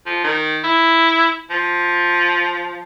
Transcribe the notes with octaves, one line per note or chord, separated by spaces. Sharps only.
F3
D#3
E4
F3